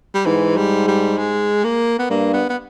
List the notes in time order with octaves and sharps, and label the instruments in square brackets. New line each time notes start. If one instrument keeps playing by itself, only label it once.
[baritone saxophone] G3
[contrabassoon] G#2 [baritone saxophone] E3
[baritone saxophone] G3
G3
G#3
A#3
B3
[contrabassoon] G2 [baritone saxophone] A#3
[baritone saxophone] B3
B3